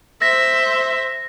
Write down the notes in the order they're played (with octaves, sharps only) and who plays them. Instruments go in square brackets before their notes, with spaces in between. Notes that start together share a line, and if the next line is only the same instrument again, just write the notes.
[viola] C5 E5 [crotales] A#6